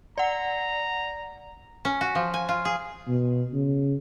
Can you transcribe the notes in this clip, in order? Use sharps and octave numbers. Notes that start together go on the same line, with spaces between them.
D5 F#5 A#5
C#4
F#4
F3
G#5
F4
G#4
B2
C#3